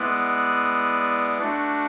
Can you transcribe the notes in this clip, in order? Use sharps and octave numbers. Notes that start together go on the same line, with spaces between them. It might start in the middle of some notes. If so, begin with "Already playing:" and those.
Already playing: G#3 B3 E4 B4 D5
A3 D4 F#4